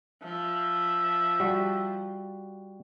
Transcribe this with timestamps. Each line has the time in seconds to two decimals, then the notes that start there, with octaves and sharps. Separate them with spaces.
0.24 F3 E5
1.40 G3 F#4